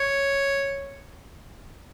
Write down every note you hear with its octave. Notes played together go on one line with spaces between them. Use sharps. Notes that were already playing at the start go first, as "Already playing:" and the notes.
Already playing: C#5